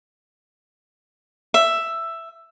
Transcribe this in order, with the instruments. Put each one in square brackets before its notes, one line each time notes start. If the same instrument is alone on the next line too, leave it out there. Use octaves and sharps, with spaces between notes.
[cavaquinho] E5